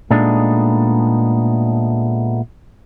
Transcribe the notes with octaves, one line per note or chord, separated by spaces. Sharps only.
A#2 G#3 A3 B3 D4 D#4